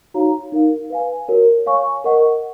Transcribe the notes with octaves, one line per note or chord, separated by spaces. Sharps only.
D#4 F#4 C#5 F5 A#5
D#4 A#4 F5
B4 F5 G#5
F#4 A#4 C#5
C#5 F5 G#5 C#6
A#4 D#5 F#5 C#6